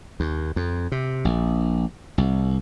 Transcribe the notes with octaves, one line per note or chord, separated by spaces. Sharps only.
D#2
F2
C3
A#1
C2